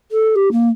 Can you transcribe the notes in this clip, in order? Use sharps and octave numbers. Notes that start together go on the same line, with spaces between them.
A4
G4
A#3